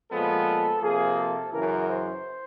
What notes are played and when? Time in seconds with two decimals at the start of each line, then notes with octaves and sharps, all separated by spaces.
0.11 A#2 F3 G#3 B3 A4
0.82 C3 F3 A#3 G#4
1.17 A4
1.52 F#2 C#3 E3 A#4
1.88 C5